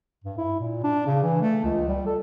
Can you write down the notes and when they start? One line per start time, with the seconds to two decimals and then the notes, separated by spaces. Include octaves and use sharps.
0.24 G2
0.38 E4
0.60 A#2
0.83 D4
1.06 C#3
1.23 E3
1.42 A3
1.64 C#2
1.88 G3
2.06 A4